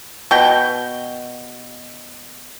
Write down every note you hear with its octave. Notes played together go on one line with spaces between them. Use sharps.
B2 G5